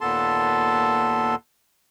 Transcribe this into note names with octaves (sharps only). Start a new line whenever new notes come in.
D#2 A#2 B3 A4 A5 C6